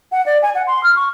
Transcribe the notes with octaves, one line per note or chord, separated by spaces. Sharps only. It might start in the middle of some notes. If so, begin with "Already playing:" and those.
F#5
D5
G#5
F#5
C6
F6
C#6